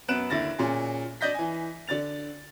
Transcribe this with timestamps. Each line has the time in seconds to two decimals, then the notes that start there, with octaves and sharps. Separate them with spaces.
0.08 F#2 B3 F#6 D7 E7
0.30 D#2 D3 E4 A6 A#6
0.58 A#2 C#4 G#4
1.21 D4 D5 D#5 G6 A#6 B6
1.34 E3 G#5
1.88 D3 D5 A6 F7